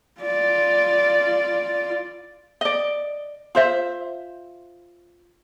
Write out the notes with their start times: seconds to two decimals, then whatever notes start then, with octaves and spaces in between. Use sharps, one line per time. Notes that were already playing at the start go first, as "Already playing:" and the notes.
0.21 F4 D5
2.61 D5 D#5
3.55 F4 C5 E5